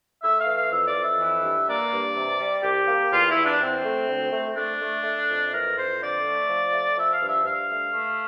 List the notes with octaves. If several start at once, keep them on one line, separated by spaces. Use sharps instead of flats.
A3 E5
F5
E3
F5
F2 E5
D5
F2
E5
E3
G2
A#3 D5
G2
C3
G3
C2 G4
A#3
E2 F4
E4
E2
D4
E2 C4
A3
D2
A3
A3 D4
A3
A3
F2
E3 A#4
F2 C5
D3 D5
A3
F3
A3
F3 E5
F5
G2
E5
G2 F5
A3
A3